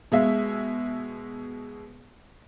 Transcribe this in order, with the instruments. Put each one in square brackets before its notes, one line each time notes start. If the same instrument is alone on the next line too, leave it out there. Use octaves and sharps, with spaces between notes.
[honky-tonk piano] B2 G#3 E5